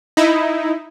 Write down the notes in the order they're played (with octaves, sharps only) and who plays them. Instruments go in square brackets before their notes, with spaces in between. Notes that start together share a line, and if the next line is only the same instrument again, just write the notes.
[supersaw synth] D#4 E4